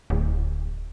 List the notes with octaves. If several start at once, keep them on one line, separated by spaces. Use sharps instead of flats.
D1